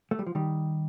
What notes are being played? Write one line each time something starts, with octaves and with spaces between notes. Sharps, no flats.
A3
G3
F3
D#3 G3